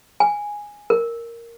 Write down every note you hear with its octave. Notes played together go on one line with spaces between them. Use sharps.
G#5
A#4